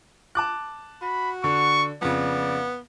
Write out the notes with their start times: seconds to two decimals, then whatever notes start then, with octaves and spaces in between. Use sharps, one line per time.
0.35 A5 D6 F#6
1.02 F#4 B5
1.44 D3 C#6
2.02 F2 C#3 B3 D5